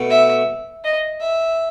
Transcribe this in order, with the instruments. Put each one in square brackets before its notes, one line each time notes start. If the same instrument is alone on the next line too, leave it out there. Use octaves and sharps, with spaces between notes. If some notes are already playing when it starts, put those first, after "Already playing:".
Already playing: [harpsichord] B2 A3
[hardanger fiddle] E5
D#5
E5